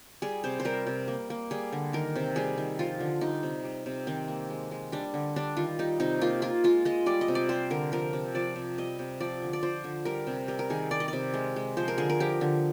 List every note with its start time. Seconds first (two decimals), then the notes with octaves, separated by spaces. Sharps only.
0.22 G3 G#4
0.44 C3 C5
0.60 C5
0.65 G3 A#4
0.87 C3
1.08 A#3
1.30 A#3
1.51 G3 G#4
1.72 D3
1.93 D#3 A#4
2.15 C3
2.36 G3 G#4
2.58 D#3
2.79 F3 F4
3.00 D3
3.21 G3 D#4
3.43 C3
3.65 G3
3.86 C3
4.07 D#3 C4
4.28 A#3
4.50 G#3
4.71 G#3
4.92 G3 D4
5.14 D3
5.36 G3 D4
5.57 D#3 F4
5.79 G3 D#4
6.00 C3 D#4
6.21 A#3 F4
6.42 A#3 F4
6.64 G#3 F4
6.85 G#3 D#5
7.06 G3 D5
7.21 D#5
7.28 C3
7.35 D5
7.49 G3 C5
7.70 D3 A#4
7.92 F3 A#4
8.13 C3
8.35 F3 D5
8.56 C3
8.78 G3 D#5
8.99 C3
9.20 F3 D5
9.42 D3
9.53 D5
9.63 F3 C5
9.84 D3
10.05 G3 A#4
10.27 C3
10.48 G3 A#4
10.59 A#4
10.70 D#3 G#4
10.91 G3 D5
11.00 D#5
11.08 C3 D5
11.34 G#3
11.56 G#3
11.77 F3 C5
11.88 A#4
11.98 D3 G#4
12.10 A#4
12.20 F3 G4
12.41 D3